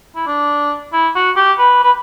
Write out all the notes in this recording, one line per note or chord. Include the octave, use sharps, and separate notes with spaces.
E4
D4
E4
F#4
G4
B4
B4